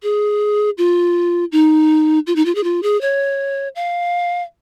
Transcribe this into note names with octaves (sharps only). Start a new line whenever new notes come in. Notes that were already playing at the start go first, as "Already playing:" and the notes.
G#4
F4
D#4
F4
D#4
F4
G#4
F4
G#4
C#5
F5